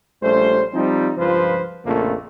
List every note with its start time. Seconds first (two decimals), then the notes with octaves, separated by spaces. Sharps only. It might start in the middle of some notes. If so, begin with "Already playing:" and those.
0.22 A#1 G3 A3 C#4 C5
0.74 F3 G3 C4 D#4
1.18 C#2 G2 F3 F4 B4 C5
1.85 A#1 F2 C#3 F3 A3 A#3